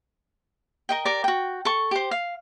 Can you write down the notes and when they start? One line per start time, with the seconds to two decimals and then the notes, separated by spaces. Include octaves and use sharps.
0.89 A#4 D#5 G5
1.05 G4 A#4 D5
1.24 F#4 G5
1.65 A4 C#6
1.91 G4 C5
2.11 F5